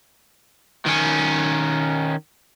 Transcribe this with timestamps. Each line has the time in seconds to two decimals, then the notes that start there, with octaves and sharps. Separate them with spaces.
0.86 D#3 C#4